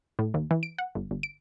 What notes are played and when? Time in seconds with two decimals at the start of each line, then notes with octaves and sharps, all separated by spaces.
0.19 A2
0.34 D#2
0.51 E3
0.63 D7
0.78 F#5
0.95 G1
1.11 G1
1.23 D7